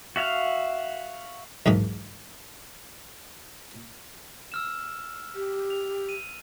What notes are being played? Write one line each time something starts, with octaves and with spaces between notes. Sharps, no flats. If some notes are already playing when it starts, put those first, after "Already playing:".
F#4 E5 F5
B1 E2 G#2 D#3
E6 F6 E7
G4
F7
D#7